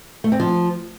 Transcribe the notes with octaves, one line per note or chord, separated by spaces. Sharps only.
A3
C4
F3